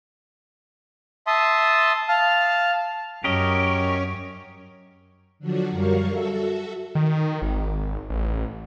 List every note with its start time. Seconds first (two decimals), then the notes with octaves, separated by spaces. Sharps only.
1.27 E5 A5 C6 D#6
2.09 F5 A5 F6
3.24 F#2 C#4 G4 A#4 D#5
5.39 D3 F3 F#3 D4 F#4
5.70 F#2 F#3 G3 A#4 F5 C#6
6.11 F#4 A4 E5
6.95 D#3
7.42 G#1
8.10 A1